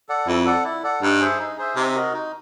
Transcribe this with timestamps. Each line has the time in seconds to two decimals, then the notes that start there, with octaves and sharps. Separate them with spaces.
0.09 A4 D5 F#5
0.27 F2 E4
0.45 A4 D5 F#5
0.64 E4
0.83 A4 D5 F#5
1.02 G2 D#4
1.20 G#4 C5 E5
1.39 D#4
1.58 G#4 C5 E5
1.76 C3 D#4
1.95 F#4 A#4 D#5
2.13 D#4